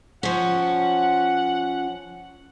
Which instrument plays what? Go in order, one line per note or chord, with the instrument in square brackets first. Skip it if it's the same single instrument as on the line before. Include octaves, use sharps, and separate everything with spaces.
[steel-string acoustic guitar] F3 C#4 [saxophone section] F#5